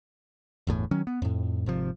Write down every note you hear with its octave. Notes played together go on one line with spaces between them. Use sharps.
G1 E2 A2
D#3 F#3 C#4
B3
F2 A2
G#1 C3 F3